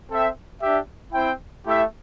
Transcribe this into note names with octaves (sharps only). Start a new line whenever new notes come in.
C4 A4 E5 G5
D4 G4 E5
C4 E4 C5 G5
A3 E4 G4 E5